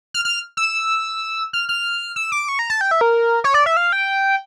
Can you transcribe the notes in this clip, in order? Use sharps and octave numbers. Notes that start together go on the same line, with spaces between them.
F6
F6
E6
F6
F6
E6
D6
C#6
A#5
A5
G5
E5
A#4
C#5
D5
E5
F5
G5